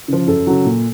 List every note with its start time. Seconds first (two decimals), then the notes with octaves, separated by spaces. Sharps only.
0.08 C#3 F3
0.27 F#2 A4
0.47 C#3 F#3
0.65 A#2